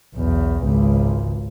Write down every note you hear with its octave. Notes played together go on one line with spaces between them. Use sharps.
B1 E2
G#1 C#2